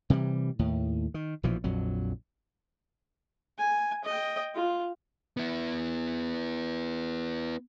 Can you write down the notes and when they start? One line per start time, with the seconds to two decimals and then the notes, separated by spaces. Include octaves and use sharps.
0.10 C3 E3 F3 G3
0.59 D#2 A2
1.14 D#3
1.43 A#1 B2 E3 F3
1.64 A#1 F2 F#3
3.58 G#5
4.04 D#5 G5
4.55 F4
5.37 B3 E4